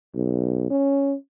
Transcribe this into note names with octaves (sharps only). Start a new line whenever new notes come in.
B1
C#4